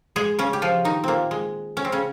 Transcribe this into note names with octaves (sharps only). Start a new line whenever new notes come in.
G#3 G#4
C#3 C#4
G4
F3 F4
D#3 D#4
A#2 A#3 C4
G#3
C#4
C4
C#3 C#4